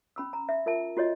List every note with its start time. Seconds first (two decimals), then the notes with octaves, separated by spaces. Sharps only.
0.16 C#4 B5 E6
0.33 A#5
0.49 E5
0.66 F4 A#4 E5 A5
0.97 F4 F#4 C#5 D#5